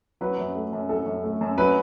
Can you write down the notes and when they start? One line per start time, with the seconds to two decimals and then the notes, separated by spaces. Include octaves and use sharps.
0.21 F#3 B4
0.38 F#2
0.55 A3
0.73 F#2
0.89 F#3 A4
1.06 F#2
1.24 A3
1.41 F#2
1.58 F#3 B4